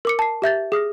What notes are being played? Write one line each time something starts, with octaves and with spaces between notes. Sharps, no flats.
A#4 D6 C#7
A5 C7
G4 E5 G6 A6
G#4 D#6 F6 A#6